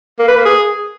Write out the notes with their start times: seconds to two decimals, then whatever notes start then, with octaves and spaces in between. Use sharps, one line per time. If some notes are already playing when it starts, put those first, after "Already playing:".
0.19 A#3
0.28 B4
0.37 A#3
0.45 G#4